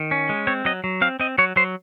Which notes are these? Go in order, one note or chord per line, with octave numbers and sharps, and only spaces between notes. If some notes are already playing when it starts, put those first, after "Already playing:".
Already playing: D#3
C#4
G#3
C4 C#5
F#3 D#5
F#3
C4 F5
C4 D#5
F#3 C#5
F#3 C5